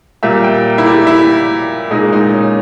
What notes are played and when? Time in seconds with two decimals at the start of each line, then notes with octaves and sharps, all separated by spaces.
0.23 A#2 G3 E5
0.44 G5
0.78 E4
0.86 G4
1.07 E4
1.91 A#2 G#3 D#4
2.12 D#4
2.33 C#4